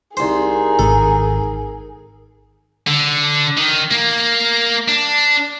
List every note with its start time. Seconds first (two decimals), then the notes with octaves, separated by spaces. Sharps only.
0.17 C2 D#4 G#4 A#4 C5
0.79 G#1 A4
2.87 D3
3.58 D#3
3.91 A#3
4.88 D4